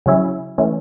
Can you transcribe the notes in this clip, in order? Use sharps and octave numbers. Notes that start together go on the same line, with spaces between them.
C#3 F#3 C#4 E4
E3 A3 C#4